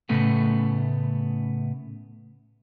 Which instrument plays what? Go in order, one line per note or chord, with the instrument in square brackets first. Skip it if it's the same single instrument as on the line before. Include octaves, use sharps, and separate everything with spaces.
[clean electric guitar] A2 C#3 A3 B3